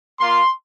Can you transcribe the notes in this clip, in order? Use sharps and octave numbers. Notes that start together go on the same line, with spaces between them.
A#3 F4 C6